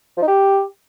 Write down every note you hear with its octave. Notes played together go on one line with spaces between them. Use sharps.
F3
D#4
G4